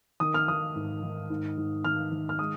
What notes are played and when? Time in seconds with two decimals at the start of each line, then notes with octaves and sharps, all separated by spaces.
0.20 D#3 D#6
0.34 F6
0.48 D#3 D#6
0.76 G#2
1.03 D#3
1.30 G#2
1.57 G#2
1.85 D#3 F6
2.12 D#3
2.29 F6
2.39 G#3 D#6